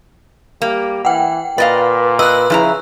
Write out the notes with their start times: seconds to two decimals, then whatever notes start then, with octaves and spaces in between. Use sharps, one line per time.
0.62 G3 A#3
1.05 E3 F#5 G5
1.58 A#2 B4 D5 D#5 F5
2.19 B4 D#5 E6 F#6
2.50 C#3 F3 E4 A#5